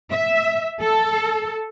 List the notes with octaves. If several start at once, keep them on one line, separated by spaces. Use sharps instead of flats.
E5
A4